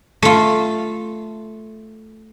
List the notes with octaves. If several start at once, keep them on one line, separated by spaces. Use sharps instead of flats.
A3 F4